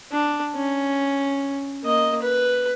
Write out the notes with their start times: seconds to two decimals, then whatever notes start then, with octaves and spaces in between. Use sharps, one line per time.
0.12 D4
0.56 C#4
1.84 A#3 D#5
2.23 B4